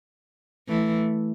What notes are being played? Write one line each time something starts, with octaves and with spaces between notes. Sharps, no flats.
E3 A3